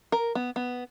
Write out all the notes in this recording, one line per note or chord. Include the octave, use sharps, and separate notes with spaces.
A#4
B3
B3